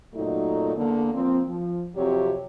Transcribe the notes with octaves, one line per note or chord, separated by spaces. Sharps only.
F#2 A#2 F#3 A3 D#4
E2 D3 A#3
F3 A#3 C4
F3
F2 C3 F#3 G4 C#5